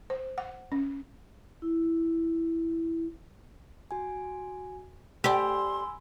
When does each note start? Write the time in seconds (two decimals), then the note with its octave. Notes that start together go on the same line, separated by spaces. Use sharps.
0.10 C5
0.38 F#5
0.72 C#4
1.62 E4
3.91 F#4 G#5
5.24 G4 D5 G#5 B5 C6 E6